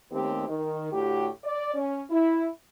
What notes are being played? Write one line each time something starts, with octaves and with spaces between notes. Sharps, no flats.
D#2 D#3 A3 C4 C#4 G4
D#3
A2 D3 F#4 G4
D5
C#4
E4